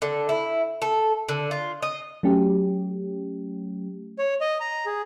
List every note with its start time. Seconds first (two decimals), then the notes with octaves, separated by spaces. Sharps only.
0.02 D3
0.29 E4
0.82 A4
1.29 D3
1.51 F4
1.82 D#5
2.23 F#3 A3 C#4 G4
4.19 C#5
4.41 D#5
4.60 A#5
4.86 G#4